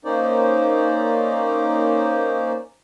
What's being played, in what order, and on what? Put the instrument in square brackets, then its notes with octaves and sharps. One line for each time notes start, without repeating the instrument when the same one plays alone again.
[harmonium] A#3 C#4 D#4 C5 D5